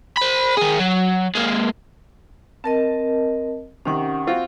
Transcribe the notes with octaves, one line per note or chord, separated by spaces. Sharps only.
C5 B5
D#3 G#4
F#3
G#3 A#3
C4 A#4 D#5 A5
C3 D#3 C#4 F#5
C4 F4 F#4